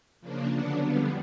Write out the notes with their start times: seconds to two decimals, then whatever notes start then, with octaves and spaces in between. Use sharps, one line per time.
0.21 C#3 F3 A#3 D4
0.53 D3 F#3 B3 D4 F#5
0.84 F2 D3 G3 B3 F5